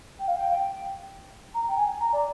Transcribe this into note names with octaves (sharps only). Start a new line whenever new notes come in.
G5
F5
G5
A#5
G5
G#5
A#5
D5